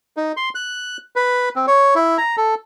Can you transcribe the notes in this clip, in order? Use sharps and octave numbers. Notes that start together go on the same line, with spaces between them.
D#4
C6
F#6
B4
C4
C#5
E4
A#5
A4